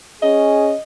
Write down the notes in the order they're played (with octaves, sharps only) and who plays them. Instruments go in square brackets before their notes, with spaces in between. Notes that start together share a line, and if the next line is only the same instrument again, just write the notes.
[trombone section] C#4 G#4 [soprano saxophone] D#5